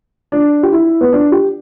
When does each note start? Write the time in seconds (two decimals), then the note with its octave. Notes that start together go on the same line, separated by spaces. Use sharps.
0.32 D4
0.63 G4
0.72 E4
1.01 B3
1.12 D4
1.32 G4